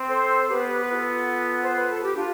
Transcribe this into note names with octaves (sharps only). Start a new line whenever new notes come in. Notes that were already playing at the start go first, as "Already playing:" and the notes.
Already playing: C4
A4 C5
B3 G4 B4
B4
F4 A4
C5
B4
A4
G4
D4 F4